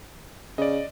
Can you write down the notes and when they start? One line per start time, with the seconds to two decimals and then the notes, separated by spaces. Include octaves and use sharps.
0.58 C#3 D5 D#5